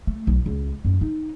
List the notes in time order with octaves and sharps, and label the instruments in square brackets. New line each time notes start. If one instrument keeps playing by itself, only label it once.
[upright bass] A3
B1
C#2
F#2
D#4